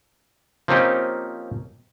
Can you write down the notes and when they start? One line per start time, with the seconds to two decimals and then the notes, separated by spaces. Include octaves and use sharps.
0.68 F3 A#3 C4 C#4 D#4 G4